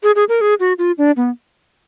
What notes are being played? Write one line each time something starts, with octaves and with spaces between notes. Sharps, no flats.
G#4
G#4
A#4
G#4
F#4
F4
D4
B3